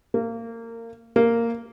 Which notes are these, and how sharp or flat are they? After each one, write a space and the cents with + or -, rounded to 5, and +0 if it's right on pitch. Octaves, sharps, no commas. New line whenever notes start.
A#3 -25
A#3 -10